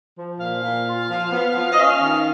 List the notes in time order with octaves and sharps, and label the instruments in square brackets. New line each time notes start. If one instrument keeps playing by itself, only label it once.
[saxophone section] F3
A#2 F5
A#2
F4
F3
B3
F3
D#5
C#4 F5
D#3